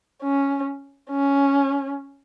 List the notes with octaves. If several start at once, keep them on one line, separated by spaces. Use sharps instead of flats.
C#4
C#4